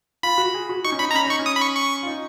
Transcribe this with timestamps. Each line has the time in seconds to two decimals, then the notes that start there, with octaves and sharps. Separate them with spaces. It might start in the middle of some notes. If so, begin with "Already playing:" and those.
0.23 F4 B5
0.38 F#4
0.54 G#4
0.69 F#4
0.84 D#4 C#6
0.92 C#4
0.99 D#4 B5
1.11 A#5
1.14 C#4 B5
1.26 D#4 C#6
1.39 C#4
1.46 D#6
1.56 B5
1.61 C#6
1.76 C#6
2.03 F4
2.07 D#4